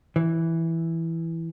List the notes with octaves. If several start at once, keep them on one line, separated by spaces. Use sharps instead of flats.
E3